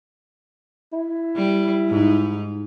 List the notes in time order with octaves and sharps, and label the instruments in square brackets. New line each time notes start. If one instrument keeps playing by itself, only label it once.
[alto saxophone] E4
[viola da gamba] G3
G#2 D#4